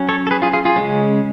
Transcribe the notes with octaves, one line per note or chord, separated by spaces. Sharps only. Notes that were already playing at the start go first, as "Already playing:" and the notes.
Already playing: F#3 C#4
A4 C#5
A4
G#4 B4
F4 G#4
F4 G#4
F4 G#4
C#3 G#3 C#4